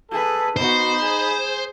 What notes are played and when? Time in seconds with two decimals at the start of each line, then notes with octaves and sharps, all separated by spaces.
0.11 G#4 A4 B4
0.56 B3 D#4 F#4 C5 B5
1.00 G#4